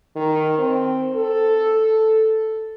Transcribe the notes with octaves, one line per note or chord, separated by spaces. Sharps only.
D#3
C4
A4